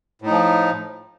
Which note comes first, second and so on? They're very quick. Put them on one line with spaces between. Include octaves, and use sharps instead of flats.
A2 D#4 F3